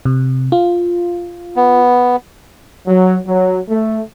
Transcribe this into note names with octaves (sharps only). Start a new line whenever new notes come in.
C3
F4
B3
F#3
F#3
A3